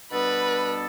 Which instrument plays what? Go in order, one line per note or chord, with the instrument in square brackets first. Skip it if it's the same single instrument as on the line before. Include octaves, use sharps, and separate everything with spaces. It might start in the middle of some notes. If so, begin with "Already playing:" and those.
[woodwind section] B2 G3 B3 D4 A4 [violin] B4